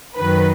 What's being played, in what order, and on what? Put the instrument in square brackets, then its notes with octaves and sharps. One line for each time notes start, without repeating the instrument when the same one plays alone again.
[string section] F#2 D#3 F#3 B4